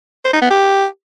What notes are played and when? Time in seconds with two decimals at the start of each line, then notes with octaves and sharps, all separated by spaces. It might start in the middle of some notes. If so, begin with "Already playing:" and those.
0.24 C5
0.33 D#4
0.42 B3
0.50 G4